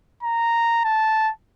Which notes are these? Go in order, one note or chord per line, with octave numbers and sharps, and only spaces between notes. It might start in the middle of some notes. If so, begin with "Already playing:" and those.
A#5
A5